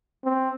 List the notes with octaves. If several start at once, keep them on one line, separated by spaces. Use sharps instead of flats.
C4